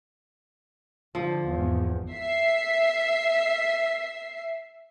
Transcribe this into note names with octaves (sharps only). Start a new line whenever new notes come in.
D3 F3
G#1 E2
E5 C7